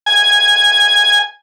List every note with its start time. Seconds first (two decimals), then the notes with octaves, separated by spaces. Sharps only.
0.06 G#5